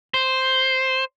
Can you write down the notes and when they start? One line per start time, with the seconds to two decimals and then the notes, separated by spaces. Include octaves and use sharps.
0.14 C5